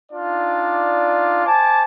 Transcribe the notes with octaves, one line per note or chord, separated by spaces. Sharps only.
D4 D#4 F4 D5
C5 G#5 A5 D6